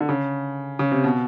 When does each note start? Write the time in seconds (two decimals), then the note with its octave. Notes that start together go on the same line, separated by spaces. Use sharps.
0.01 D3
0.09 C#3
0.79 C#3
0.92 C3
1.04 B2